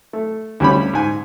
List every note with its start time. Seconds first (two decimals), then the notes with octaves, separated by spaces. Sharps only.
0.13 A3
0.60 D2 G3 C#4 B5
0.93 G#2 G#5